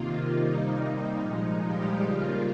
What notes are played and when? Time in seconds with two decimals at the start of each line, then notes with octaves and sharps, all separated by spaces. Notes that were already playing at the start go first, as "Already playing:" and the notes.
Already playing: C3 D#3 A#3 F4
0.37 C3 G3 A#3 D#4
1.20 A#2 F3 G#3 D#4
1.61 G3 G4
2.03 C#3 G3 A#3 F4